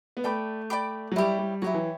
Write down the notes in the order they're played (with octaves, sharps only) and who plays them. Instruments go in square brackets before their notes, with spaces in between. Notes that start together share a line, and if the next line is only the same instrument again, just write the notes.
[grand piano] B3
[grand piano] A3 [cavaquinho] D5 G5 B5 D6
[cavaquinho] D5 G5 B5 D6
[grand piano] F#3
[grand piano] G3 [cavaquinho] E4 G4 C#5
[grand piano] G3
[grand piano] F#3 [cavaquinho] E4 G4 C#5
[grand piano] E3